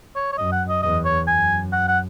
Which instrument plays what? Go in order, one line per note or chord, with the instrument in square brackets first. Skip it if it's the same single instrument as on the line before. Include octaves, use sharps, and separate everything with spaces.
[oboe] C#5
C#5
[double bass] F#2 [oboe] D#5
[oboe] F#5
D#5
[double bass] E2 [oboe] D#5
[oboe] C#5
[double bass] F#2 [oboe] G#5
[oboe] F#5
F#5